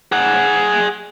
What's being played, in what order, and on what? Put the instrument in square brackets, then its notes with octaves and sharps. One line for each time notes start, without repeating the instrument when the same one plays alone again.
[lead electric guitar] G#4 F#5